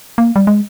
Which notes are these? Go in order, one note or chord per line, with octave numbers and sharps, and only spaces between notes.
A#3
G3
G#3